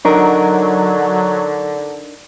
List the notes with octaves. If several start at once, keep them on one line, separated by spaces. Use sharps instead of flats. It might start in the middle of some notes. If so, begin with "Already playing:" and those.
D3 F#3 D4 D#4 A#4